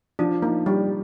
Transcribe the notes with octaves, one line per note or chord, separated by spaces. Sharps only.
F3 D4
A#3 D#4
G3 G4